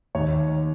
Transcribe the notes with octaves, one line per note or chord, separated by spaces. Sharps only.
D#2 D#3 C#5